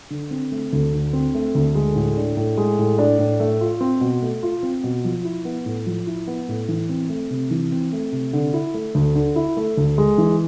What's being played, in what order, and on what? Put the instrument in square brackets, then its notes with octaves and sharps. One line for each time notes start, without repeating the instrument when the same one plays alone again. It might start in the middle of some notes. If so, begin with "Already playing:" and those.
[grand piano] D3
C4
A3
D2
D3
C4
A3
D2
G#3
A2
D4
A2
G#3
A2
D4
A2
A3
F4
C4
B2
A3
F4
C4
B2
F3
E4
B3
A2
F3
E4
B3
A2
E3
C4
A3
C3
E3
C4
A3
C3
D3
E4
A3
D2
D3
E4
A3
D2
G#3
E3